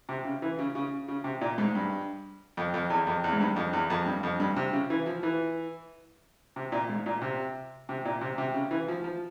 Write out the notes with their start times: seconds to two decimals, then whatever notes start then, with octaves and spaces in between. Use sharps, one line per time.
0.09 C3
0.25 C#3
0.42 E3
0.59 C#3
0.75 C#3
1.08 C#3
1.24 C3
1.41 A#2
1.58 G#2
1.75 G2
2.57 F2
2.74 F2
2.90 E2
3.07 F2
3.24 E2
3.33 G#2
3.40 G2
3.56 F2
3.73 E2
3.90 F2
4.06 G2
4.23 F2
4.40 G2
4.56 C3
4.73 C#3
4.90 E3
5.06 F3
5.23 E3
6.56 C3
6.72 A#2
6.89 G#2
7.06 A#2
7.22 C3
7.89 C3
8.05 A#2
8.21 C3
8.38 C3
8.54 C#3
8.71 E3
8.88 F3
9.04 F3